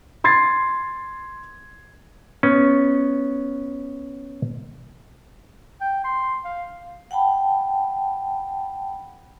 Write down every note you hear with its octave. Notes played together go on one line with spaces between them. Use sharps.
C6 G#6 A6 C7
B3 C#4
G5
C6
F5
F#5 G5 A5 B5